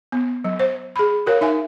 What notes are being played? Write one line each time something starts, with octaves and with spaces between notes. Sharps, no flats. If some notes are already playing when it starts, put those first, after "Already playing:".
B3
F#3
C5
G#4 B5
F#4 A#4 C#5 F5
D#4 E5 G#5